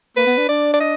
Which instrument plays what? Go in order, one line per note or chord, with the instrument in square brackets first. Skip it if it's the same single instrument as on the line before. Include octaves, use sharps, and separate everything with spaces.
[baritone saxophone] A#3 [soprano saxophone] B4
[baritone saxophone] B3
D4
[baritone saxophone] D4 [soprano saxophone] D5
[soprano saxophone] D5
D#5